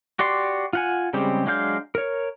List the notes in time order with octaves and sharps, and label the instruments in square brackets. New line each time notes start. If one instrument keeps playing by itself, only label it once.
[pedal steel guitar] F#4 G4 D5 C6
F4 F#5 G#5
C#3 G3 G#3 C4 G4
F#3 G#3 D4 F5 G6
A#4 C#5